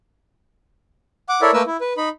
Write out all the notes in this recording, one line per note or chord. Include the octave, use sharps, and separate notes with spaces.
F#5 D6
E4 A4 A#4 C#5 D5 E5
A3 A#3 A#4 B4 E6
E4
B4
D#4 B5